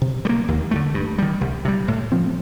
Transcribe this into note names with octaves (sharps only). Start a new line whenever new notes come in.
C3
G3
A#3
D#2
D3 F3 A3
G2
D#3 G3
C2
C3 G3
A2
F3 C4